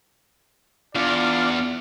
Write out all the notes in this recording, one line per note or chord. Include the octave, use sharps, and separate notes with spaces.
E2 D4 F4 D5